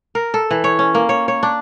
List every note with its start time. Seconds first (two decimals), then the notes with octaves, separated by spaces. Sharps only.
0.15 A#4
0.34 A4
0.51 E3
0.64 C#5
0.79 C#4
0.95 A#3
1.09 C#5
1.28 C#5
1.43 D4